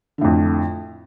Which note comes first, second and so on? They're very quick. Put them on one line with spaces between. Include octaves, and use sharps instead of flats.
D3 A2 F2